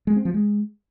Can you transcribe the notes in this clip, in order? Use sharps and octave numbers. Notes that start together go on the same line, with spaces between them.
G#3
C4
F3
G#3